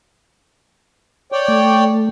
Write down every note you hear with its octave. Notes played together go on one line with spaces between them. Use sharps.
C#5 D5 G5
A3